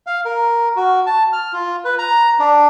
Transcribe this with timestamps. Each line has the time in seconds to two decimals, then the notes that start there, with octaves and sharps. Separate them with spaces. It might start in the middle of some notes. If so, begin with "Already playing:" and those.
0.07 F5
0.25 A#4
0.76 F#4
1.07 A5
1.33 F6
1.53 F4
1.85 B4
1.98 A#5
2.40 D4